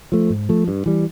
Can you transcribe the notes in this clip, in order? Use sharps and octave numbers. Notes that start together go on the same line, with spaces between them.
F3 A3
G#2
F3 A3
G2
E3 G3